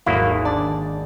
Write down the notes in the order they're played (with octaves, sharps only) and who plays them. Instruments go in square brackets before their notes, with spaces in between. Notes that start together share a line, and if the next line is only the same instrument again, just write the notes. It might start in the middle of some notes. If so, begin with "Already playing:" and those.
[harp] G#1 D#2 [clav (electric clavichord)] F#3 A#3 E4
[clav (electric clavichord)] D4 [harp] D5